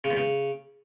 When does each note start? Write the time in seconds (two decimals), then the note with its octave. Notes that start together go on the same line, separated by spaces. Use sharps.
0.04 C#3
0.11 E2
0.17 C#3